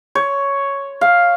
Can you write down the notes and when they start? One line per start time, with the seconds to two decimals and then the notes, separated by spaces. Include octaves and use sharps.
0.15 C#5
1.01 F5